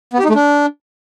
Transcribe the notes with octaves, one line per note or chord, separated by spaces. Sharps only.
B3
G4
D#4
A3
D4